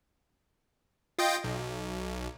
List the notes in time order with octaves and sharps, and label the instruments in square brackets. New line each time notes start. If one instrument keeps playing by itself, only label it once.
[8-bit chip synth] F4 D#5 G5
B1